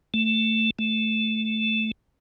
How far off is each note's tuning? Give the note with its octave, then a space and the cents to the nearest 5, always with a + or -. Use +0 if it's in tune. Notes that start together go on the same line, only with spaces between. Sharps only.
A3 +10
A3 -5